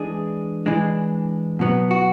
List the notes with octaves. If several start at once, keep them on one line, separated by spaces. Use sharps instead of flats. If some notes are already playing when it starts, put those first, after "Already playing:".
Already playing: E3 G#3 D4 G#4
E3 G#3 D4
B2 F#3 B3
F#4